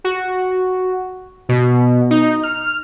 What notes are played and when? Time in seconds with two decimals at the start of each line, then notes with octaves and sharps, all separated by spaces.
0.04 F#4
1.49 B2
2.11 D#4
2.43 F6